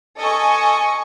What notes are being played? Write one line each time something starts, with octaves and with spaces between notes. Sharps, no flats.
A4 D#5 G#5 C#6